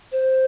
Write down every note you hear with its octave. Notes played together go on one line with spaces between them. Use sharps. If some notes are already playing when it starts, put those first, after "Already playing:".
C5